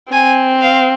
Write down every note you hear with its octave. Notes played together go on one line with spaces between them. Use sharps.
C4 G#5
F5